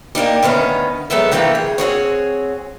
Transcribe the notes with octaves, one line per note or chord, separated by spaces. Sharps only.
A#3 D4 D#4 G4
D2 D#3 B3 C#4
F#3 G#3 B3 A4 E5
D2 D#3 E3 A3 A#3 G4
G#4
C4 F#4 G#4 C#5